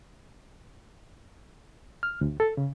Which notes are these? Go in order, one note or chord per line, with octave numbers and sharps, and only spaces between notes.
F6
D2
A4
C#3